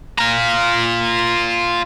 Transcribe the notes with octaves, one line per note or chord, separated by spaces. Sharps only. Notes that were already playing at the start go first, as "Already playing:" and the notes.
F4 A#5